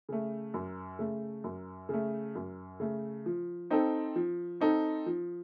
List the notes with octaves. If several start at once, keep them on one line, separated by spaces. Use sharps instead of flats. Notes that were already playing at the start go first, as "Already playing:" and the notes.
C#3 A3
F#2
C#3 A3
F#2
C#3 A3
F#2
C#3 A3
F3
C4 D#4 A4
F3
C4 D#4 A4
F3